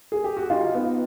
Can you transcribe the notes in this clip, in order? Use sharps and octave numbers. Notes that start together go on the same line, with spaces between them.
G#4
G4
F#4
D#4 F4
B3